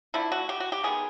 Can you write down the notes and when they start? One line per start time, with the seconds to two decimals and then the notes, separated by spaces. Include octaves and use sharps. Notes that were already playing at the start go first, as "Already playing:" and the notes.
0.14 D3 F3 A3 E4
0.32 F#4
0.49 G4
0.60 F#4
0.72 G4
0.83 D#3 G#3 B3 G#4